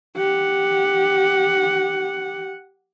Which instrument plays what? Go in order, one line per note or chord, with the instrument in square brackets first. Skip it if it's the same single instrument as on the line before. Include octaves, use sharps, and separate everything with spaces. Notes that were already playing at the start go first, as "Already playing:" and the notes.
[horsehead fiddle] G4 F#5